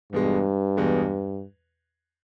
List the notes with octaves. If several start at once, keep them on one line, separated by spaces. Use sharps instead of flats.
E2 G2 B2 G#3
E2 B2 G#3